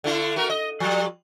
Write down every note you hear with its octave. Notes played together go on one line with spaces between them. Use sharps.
D3 A3 E4
A3 F#4 A#4
D#5
F3 G3